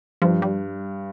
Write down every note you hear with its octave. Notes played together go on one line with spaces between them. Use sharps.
G2 F3
G3